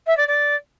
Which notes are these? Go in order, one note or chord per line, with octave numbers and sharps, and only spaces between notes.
E5
D5
D5